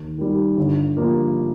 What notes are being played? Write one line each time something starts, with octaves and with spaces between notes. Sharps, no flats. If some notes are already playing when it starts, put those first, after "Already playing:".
Already playing: D#2
D#3 G3
G1
G2 F3 A#3